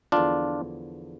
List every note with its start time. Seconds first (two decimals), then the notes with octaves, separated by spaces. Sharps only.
0.12 E2 D3 F3 D4 F4